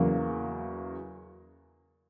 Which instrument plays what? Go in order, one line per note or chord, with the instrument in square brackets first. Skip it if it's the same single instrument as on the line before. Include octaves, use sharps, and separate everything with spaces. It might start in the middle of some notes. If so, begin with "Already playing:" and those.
Already playing: [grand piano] E2 C#3 F#3 A#3